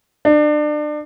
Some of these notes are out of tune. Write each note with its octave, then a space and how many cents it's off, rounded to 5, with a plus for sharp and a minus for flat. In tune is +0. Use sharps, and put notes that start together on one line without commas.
D4 +30